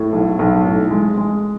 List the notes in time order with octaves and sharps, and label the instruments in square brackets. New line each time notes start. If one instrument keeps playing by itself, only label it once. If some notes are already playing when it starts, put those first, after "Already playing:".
Already playing: [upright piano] A2
B1
B1
A2
G#3
G#3